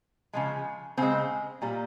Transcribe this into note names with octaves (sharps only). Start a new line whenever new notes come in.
C#3 F3 G#3
C#3 G#3 C4
A#2 G3